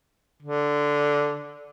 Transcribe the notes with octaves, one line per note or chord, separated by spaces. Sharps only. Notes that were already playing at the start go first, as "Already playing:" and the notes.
D3